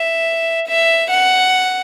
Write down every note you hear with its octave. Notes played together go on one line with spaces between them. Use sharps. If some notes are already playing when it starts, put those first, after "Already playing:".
Already playing: E5
E5
F#5